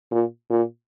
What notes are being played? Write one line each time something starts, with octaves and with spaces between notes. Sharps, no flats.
A#2
A#2